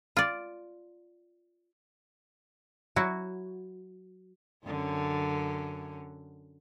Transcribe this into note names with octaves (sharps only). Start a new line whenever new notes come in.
F4 D5
F#3 E4 F#4
F#2 D3 C#4